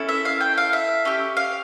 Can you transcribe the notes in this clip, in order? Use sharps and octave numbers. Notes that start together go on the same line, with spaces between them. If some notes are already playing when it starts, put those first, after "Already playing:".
Already playing: C#4 E4 A4
E5
F5
G5
F5
E5
C#4 G4
F5